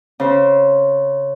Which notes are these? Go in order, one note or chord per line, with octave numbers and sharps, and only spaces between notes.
C#3 C5